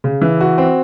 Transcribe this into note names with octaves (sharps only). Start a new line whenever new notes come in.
C#3
E3
F#4
C4